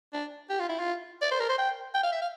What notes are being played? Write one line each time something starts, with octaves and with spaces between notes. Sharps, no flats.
D4
G4
F4
E4
F4
D5
C5
A#4
C5
G5
G5
F5
E5
F5